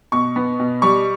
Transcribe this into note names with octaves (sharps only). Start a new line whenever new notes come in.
B2 C#6
B3
B2
G3 C#6